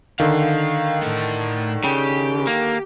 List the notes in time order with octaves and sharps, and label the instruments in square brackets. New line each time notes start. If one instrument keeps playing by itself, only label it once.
[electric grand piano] D3 D#3 [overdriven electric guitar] F5
[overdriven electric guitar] A2 A3
[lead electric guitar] C#3 [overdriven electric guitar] G4
[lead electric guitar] A#3